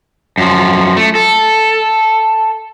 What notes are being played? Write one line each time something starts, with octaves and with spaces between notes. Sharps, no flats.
F#2 F3
A3
A4